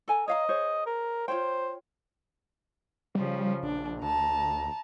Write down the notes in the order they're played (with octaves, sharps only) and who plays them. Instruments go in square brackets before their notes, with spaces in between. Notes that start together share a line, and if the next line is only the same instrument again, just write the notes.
[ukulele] A4 G#5 A#5
[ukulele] C#5 F5 A#5 [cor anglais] D#5
[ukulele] G#4 C5 C#5
[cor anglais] A#4
[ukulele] F4 C#5 G5 [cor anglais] C5
[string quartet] C#3 F3 [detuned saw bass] G3
[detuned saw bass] A#1 [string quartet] D4
[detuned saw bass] D2 [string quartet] A5 A#5